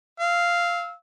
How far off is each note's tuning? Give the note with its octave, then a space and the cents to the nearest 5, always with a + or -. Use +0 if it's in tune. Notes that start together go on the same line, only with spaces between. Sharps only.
F5 -5 E6 -25